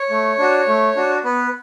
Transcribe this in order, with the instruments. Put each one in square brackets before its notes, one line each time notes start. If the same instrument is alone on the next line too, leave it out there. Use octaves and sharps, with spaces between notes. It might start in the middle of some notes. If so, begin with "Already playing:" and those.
Already playing: [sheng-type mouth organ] C#5
A3
D4 F#4
A3
D4 F#4
B3 B4